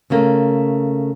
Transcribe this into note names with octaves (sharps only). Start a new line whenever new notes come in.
C#3 A3 A#3